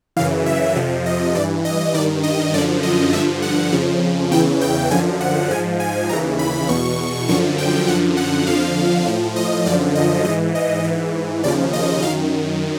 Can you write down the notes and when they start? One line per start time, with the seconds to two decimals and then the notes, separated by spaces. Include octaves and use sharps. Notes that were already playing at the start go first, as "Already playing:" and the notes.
0.16 F#2 C#3 E3 F5
0.46 E5
0.76 F2 C3 F3
1.06 D#5
1.35 G2 E3 D5
1.65 D#5
1.94 G2 D#3 D5
2.23 D#5
2.54 F#2 D3 F3 D5
2.83 D#5
3.13 G2 D3 F3 E5
3.42 F#5
3.72 F2 C#3 F3
4.31 E2 C#3 E3 G5
4.61 G5
4.91 F#2 D3 F3 G#5
5.21 F#5
5.51 G#2 F3 G#5
5.80 G#5
6.09 D#2 C#3 E3 A#5
6.39 B5
6.69 E2 B2 C#6
7.28 F#2 D3 F3 C#6
7.58 G5
7.88 F#2 D3 F3 F#5
8.17 F#5
8.47 F2 D3 F3 F5
9.06 A2 F3
9.36 D#5
9.66 F#2 D3 F3 D5
9.95 D#5
10.25 G#2 E3 D#5
10.55 D#5
10.84 G#2 E3
11.44 D#2 C#3 F3 D5
11.73 D#5
12.03 F#2 D#3 F5